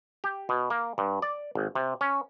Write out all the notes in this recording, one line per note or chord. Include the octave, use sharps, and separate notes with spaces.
G4
B2
A#3
G2
D5
G#1
C3
C#4